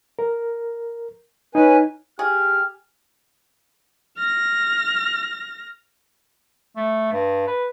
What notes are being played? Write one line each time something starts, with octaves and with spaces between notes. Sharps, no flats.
A#4
C#4 D#4 B4 G#5
G4 G#4 F6
F6 A#6
A3
G2
B4